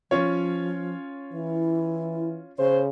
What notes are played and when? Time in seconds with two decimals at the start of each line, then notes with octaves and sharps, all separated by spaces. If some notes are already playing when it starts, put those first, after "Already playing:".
0.11 F3 C#4 F4 C#5
1.33 E3 E4
2.59 C#3 C5 C#5